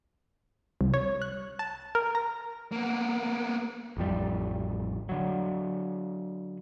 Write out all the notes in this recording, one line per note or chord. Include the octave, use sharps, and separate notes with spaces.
C2
C#5
F#6
A5
A#4
A#5
A#3 B3
A1 F2 G3
D3 F#3